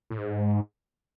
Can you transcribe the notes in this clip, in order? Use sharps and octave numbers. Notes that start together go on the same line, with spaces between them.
A2
G#2